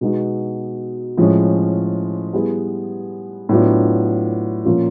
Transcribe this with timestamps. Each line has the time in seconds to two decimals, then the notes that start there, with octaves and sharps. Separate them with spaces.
0.01 B2 G#3 B3 D#4 F#4
1.17 A2 F3 G#3 C#4
2.33 G3 B3 E4 G#4 B4
3.49 A2 F#3 B3 D4 F4
4.65 A#2 F3 A#3 C#4 F4